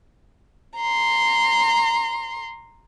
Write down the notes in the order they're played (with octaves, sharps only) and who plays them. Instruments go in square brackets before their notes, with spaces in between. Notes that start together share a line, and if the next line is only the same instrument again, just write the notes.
[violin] A#5 C6